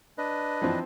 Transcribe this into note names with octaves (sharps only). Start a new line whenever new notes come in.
D4 B4 D#5
E3 F3 C4